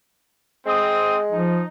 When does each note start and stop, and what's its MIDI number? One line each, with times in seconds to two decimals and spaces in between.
0.66 1.50 56
0.66 1.19 60
0.66 1.19 87
1.31 1.63 53
1.31 1.68 63